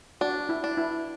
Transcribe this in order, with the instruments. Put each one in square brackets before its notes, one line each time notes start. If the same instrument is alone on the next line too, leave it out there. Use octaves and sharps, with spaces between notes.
[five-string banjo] D4 [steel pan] F#4
[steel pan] E4
[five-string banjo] D4
[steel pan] E4